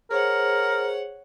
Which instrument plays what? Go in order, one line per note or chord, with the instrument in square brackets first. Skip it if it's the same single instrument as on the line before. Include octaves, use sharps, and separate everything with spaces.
[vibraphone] G#4 C5 [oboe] A#4 [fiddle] C#5 F#5